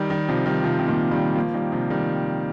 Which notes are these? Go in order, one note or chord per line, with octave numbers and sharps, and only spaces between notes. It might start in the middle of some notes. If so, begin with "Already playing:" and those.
Already playing: D#3 G3
D#3 G3
C3 F3
D#3 G3
C3 F3
C3
A#2 D#3
D#3 G3
F3 A#3
D#3 G3
C3 F3
D#3 G3